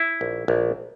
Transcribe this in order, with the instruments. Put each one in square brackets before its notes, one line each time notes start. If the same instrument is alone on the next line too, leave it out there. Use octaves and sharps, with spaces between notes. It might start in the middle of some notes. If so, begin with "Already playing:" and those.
Already playing: [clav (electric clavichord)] E4
A#1
A#1